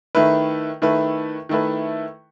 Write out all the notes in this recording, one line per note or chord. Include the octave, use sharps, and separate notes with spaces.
D#3 A3 E4 B4
D#3 A3 E4 B4
D#3 A3 E4 B4